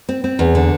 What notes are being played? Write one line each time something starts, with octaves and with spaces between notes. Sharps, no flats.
C4
C4
E2
D3